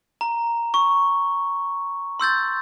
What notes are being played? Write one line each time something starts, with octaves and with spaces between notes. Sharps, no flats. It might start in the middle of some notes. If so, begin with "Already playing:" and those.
A#5
C#6
C6 E6 G6 A6